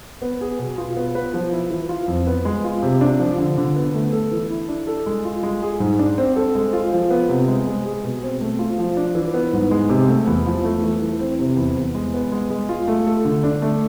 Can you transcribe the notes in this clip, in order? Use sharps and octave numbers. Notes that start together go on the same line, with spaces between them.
B3
G#4
B2
F4
B3
B4
F3
E4
E3
F4
F2
B3
G#3
F4
C3
D4
F3
D3
D3
B3
A3
A4
E3
E4
D4
A4
G#3
F4
G#3
G#4
G#2
D4
C4
A4
G#3
F4
F3
B3
C3
G#3
G#3
G#4
B2
C4
A3
F4
F3
D4
E3
B3
G#2
G#3
C3
A3
E2
F3
A3
E3
E3
C4
C3
E2
E2
G#3
B3
G#3
G#3
F4
A3
A4
D3
D4
A3